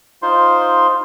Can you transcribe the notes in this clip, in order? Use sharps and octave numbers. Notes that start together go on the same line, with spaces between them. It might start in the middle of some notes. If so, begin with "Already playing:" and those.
D#4 F4 C5 C6